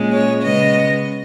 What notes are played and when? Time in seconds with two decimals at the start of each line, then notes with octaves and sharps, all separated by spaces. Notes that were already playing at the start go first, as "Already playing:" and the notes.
Already playing: A#2 G#3 C#4
0.13 C#5
0.42 C#3 G#3 B3 D#5